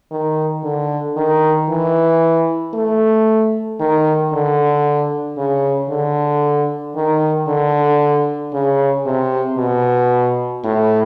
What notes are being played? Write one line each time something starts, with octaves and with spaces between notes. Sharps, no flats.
D#3
D3
D#3
E3
A3
D#3
D3
C#3
D3
D#3
D3
C#3
C3
B2
A2